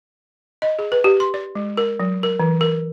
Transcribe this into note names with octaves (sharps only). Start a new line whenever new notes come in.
D#5
G#4
B4
G4
C6
D5
G#3
A#4
F#3
A#4
E3
A#4